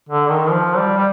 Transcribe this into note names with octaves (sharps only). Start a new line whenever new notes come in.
D3
D#3
F3
G3
G3